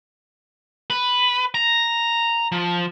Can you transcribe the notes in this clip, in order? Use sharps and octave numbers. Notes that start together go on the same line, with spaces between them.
B4
A#5
F3